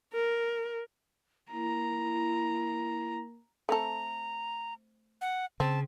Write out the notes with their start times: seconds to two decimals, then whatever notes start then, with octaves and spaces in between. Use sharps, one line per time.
0.13 A#4
1.52 A#3 E4 A#5
3.69 A3 C4 A4 A#5
5.21 F#5
5.60 C#3 C4 A5